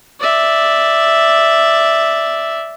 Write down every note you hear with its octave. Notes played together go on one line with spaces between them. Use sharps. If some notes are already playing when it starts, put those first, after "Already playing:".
D5 E5